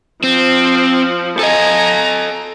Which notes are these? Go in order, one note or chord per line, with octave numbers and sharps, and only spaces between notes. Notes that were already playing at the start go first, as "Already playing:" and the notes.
F3 C4
A4 D#5 G#5 A#5